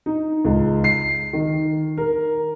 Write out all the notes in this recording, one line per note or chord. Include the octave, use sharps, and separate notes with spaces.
D#4
C#2
C7
D#3
A#4